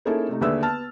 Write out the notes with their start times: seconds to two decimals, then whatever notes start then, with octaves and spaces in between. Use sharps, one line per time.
0.05 A#3 C#4 D#4 E4 G#4 A4
0.29 C3 A3 D#4
0.41 D#2 D3 G#4 B4 E5 E6
0.62 B3 A5 F6 A6